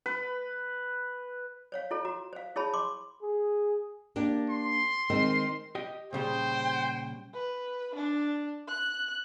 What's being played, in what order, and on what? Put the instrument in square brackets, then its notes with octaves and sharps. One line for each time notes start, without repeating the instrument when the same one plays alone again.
[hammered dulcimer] B4
[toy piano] C5 C#5 F5
E4 F4 A4 C#5
F#4 A#5
C5 F5
E4 G#4 C#5 A5 B5
C6 D6
[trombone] G#4
[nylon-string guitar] A#3 D4 G4
[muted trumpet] C6
[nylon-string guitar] D#3 G#3 C4
[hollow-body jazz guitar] G4 D#5 G5
[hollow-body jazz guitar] A#2 C#3 G3 [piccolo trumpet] C5 [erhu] G5
[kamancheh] B4
D4
F#6